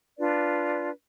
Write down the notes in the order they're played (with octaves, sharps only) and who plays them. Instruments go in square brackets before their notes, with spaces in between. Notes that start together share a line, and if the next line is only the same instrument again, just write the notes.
[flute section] D4 F4 B4 D5